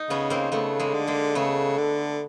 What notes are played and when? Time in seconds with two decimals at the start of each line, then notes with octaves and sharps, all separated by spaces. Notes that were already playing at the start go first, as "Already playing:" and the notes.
Already playing: D#4
0.10 C#3 B3 C#4
0.30 A#3 C4
0.52 C#3 A3 B3
0.80 G#3 A#3
0.94 D3
1.07 G#3 A#3
1.35 C#3 A3 B3
1.78 D3